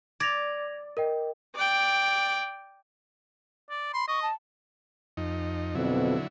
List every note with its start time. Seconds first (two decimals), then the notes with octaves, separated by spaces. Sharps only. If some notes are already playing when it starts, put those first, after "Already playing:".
0.20 D5 G#6 A#6 F7
0.97 A#4 D#5 G5
1.55 D5 G5
3.70 D5
3.94 B5 C6
4.08 D#5 C#6
4.22 A5
5.17 F2 D#4
5.75 F2 B2 D3 F#3 E4